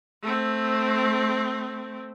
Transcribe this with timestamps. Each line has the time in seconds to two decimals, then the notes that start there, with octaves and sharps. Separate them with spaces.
0.22 A3 C4